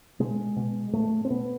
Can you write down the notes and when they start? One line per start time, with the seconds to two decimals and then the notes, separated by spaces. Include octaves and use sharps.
0.20 B2 G#3
0.56 B2
0.93 A2 A3
1.25 C4
1.30 B2 B3